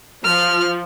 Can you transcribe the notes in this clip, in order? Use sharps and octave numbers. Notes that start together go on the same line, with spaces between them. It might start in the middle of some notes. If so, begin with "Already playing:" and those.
F3 F6